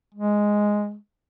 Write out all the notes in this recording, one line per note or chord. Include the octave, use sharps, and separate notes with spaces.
G#3